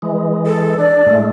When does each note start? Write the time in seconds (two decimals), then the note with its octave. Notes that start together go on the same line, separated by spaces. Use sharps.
0.02 E3 G#3
0.46 A4
0.78 D4 D5
1.06 A2 G#3 A3